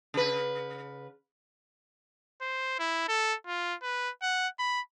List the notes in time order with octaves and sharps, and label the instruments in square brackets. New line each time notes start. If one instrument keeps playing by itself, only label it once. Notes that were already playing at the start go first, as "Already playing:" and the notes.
[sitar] C#3 B4
[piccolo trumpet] C5
E4
A4
F4
B4
F#5
B5